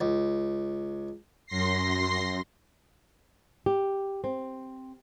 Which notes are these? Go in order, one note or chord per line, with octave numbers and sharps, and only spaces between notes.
C#2
F#2 C6 A#6 C7
G4
C4